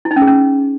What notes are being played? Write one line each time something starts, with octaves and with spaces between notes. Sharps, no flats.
E4
D#4
C#4
G#4
C#4